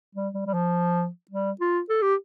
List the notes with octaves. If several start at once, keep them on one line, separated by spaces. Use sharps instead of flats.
G3
G3
G3
F3
G3
F4
A4
G4